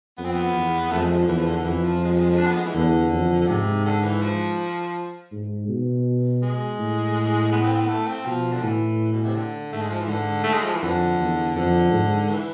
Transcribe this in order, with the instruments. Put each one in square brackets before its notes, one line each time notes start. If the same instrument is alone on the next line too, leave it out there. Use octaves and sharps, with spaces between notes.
[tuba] F2 [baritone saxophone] B3
[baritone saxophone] C4
B3
[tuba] E2
[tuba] F2 [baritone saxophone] A3
[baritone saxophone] G#3
F3
D3
[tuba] E2 [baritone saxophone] E3
[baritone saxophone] F3
D3
D3
[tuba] F2 [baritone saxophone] E3
[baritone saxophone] F3
G#3
F3
G#3
F3
D4
B3
G#3
E3
[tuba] E2 [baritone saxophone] D3
[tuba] F2
[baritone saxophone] D3
[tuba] G#2 [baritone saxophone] C3
[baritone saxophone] D3
E3
F3
[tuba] G#2
B2
[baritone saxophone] G#3
[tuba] A2
[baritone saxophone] B3
C4
B3
A3
C4
[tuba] B2 [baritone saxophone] F3
[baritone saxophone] D3
[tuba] A2 [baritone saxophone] E3
[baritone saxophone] B2
C3
D3
[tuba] G#2 [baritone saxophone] A3
[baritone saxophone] G#3
F3
E3
[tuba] G#2 [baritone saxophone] D3
[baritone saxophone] A3
G#3
F3
E3
[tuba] F2 [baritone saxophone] D3
[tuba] E2
[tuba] F2 [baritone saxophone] D3
[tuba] G#2
[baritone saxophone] E3